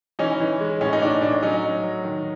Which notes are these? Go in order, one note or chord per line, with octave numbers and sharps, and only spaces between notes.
E3 C#4 D#4
E3
G#3
A2 C#4
D#4
A2 D4
A2 D4
F#3 C#4 D#4
F#3
F#3
D#3